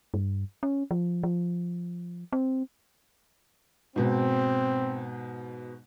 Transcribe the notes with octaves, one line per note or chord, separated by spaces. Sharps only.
G2
C#4
F3
F3
C4
G#2 B2 C4